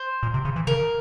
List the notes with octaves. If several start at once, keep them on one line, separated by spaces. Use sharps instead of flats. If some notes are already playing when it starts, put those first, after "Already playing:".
Already playing: C5
A#2
C3
C#3
E3
C#3 A#4